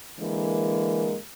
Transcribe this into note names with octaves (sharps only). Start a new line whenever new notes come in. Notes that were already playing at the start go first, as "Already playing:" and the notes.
D3 E3 G#3 A#3 A#4